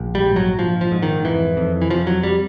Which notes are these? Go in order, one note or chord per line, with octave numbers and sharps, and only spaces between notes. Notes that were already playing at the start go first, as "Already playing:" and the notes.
Already playing: A#1
G3
G#2
F#3
A#1 F3
F3
G#2
D#3
F2 E3
F2
E3
F2 F3
F#3
G3